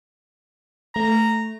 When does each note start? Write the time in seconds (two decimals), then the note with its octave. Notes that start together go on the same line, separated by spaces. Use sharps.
0.96 A3 A#5